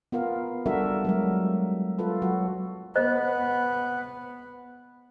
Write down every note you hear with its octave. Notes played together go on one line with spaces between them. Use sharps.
B3 F4 A#4 F5
G3 D4 F#4 A4 A#4 E5
F#3 G#3 A#4
F4 A4 B4
F#3 F#4
B3 G#4 C5 D#5